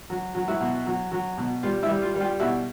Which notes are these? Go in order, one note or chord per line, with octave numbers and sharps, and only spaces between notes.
F#3
F#3
E4 F#4
B2
F#3
F#3
B2
G3 F4
E4
G3
F4
G3
F4 G4
B2 E4 F#4